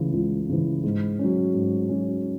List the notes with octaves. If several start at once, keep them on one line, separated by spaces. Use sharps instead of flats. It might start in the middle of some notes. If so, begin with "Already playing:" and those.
Already playing: C#2 C#3 E3
C#2
C#3 E3
G#2
F#3 C#4
G#2
F#3 C#4